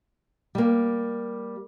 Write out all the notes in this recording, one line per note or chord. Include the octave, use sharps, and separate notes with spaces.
G3 A#3